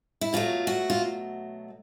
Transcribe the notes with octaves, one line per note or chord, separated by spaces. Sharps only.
E4
B2 F#3 A3 F4
F#4
F4